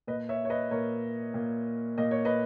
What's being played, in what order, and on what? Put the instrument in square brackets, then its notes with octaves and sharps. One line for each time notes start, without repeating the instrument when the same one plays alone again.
[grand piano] A#2 B4 D#5
C#5 E5
C#5
B4 D#5
A#2 A#4 C#5
A#2
A#2 D#5
C#5
B4 D#5